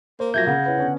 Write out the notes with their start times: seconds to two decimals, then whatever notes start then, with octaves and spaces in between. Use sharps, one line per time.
0.20 A#3 C5
0.34 A#2 F3 F#3 E5 G6 G#6 A#6
0.47 C#3 F#5
0.66 C#3 E4 B4
0.77 D3 B3 C#4